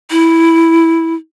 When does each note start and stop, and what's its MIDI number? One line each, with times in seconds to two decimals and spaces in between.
0.11 1.14 64